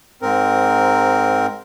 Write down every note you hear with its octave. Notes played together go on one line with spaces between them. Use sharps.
G#2 C4 A#4